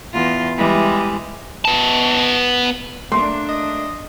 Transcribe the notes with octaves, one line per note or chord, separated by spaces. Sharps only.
E2 F4
E3 G3 G#3
B3 A5
A3 A#3 D4 C6
D#5